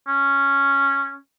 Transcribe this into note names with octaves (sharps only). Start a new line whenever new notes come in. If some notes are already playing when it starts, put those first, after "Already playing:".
C#4